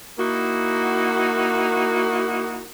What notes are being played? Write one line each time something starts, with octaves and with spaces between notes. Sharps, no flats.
A#3 D#4 E4 F#4